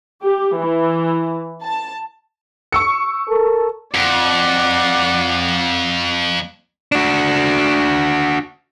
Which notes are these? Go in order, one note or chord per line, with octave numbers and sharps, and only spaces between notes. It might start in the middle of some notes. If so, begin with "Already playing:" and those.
G4
E3
A5
C#6 E6 C#7
A4 A#4
F2 D5 F#5
D4 F#4